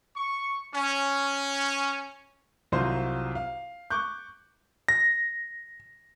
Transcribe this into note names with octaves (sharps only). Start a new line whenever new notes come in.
C#6
C#4
C2 F#3 F4 C5 C6
F5
C#6 D6 F#6 G6
A#6